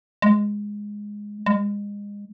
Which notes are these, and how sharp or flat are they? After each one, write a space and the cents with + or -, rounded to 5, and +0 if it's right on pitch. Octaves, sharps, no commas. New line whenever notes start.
G#3 -5
G#3 -30